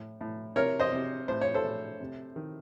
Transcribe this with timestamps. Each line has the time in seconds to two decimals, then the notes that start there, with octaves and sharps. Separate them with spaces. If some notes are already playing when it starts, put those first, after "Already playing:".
Already playing: A2
0.21 A2
0.56 C3 A#4 C#5
0.80 C5 D#5
0.92 C3
1.28 A2 C5
1.41 C#5
1.54 A4 C5
1.65 A2
2.00 C3
2.36 D#3